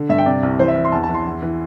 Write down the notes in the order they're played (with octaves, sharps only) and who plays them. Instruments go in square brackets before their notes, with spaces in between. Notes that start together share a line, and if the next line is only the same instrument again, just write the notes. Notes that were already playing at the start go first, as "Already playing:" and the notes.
Already playing: [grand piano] D3
G2 E5
G5
C3 D5
C2
E3 C5
E5
E3
C6
E2 A5
A5
E3
C6
E2
E3